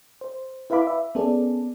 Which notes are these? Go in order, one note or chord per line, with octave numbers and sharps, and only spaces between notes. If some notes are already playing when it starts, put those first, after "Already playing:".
C5
E4 B4 E5 F5 B5 D6
E5
B3 C#4 G#4 A4 D5